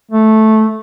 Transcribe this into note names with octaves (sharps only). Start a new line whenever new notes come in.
A3